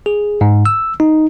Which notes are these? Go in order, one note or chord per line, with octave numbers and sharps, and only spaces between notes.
G#4
G#2
E6
D#4